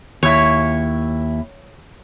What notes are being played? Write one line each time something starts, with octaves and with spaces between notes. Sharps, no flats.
D#2 E4 C#5